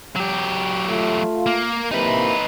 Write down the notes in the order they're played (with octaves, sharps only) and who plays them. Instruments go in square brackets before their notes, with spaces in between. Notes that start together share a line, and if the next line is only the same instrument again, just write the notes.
[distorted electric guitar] F#3 G4
[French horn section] A3 F4
[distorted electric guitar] A#3
[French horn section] C3 E3 A#3 [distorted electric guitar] D#4 B4